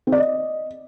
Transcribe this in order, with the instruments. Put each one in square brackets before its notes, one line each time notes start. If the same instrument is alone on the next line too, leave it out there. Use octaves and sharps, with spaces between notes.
[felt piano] C4
D5
D#5